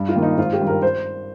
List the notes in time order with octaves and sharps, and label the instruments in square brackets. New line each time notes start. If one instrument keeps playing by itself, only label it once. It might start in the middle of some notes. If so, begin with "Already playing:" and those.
Already playing: [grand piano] G2
F4
D#3 A#3
D#4
G#1 F4
G4
G2 D#3
A#4
C5